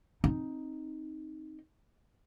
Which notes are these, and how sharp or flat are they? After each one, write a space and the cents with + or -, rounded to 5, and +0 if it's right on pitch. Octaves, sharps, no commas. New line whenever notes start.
C4 +15 D#4 +0